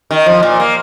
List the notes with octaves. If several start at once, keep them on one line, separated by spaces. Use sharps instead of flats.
D#3
F3
A#2
A#3